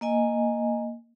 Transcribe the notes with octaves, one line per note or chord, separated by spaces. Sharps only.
A#3 D#5 G#5